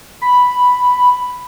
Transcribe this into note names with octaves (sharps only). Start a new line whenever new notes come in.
B5